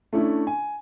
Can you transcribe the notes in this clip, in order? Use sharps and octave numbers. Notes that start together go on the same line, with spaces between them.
A3 C#4 D4 E4
G#5